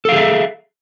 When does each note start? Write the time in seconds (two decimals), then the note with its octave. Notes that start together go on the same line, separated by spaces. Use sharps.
0.05 A4
0.09 F5
0.12 G#4
0.16 E5